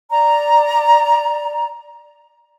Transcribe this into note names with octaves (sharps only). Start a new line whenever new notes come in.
D5 A#5